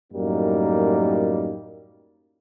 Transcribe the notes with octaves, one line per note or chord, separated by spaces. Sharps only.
F#2 A2 G3 A#3 D#4